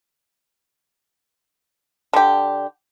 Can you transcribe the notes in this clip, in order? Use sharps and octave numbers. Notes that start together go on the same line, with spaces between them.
D3 G4